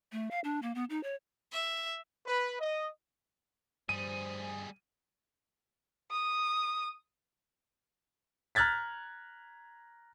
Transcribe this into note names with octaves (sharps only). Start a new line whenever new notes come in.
A3
F5
D4
A#3
B3
D#4
C#5
E5
B4
D#5
G2 G3 G#4 C5 D#7
D#6
A#5 F6 F#6 G#6 A6 B6